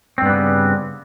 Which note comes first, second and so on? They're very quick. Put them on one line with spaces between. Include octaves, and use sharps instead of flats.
C4 G2 B3 G3 C#3